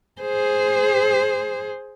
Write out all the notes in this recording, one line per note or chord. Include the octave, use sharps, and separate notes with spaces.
G#4 C5